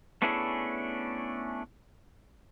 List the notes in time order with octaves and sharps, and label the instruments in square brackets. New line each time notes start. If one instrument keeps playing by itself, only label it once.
[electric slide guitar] A3 B3 C#4 D4 E4 G#4